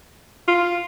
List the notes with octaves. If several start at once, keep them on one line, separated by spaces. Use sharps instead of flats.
F4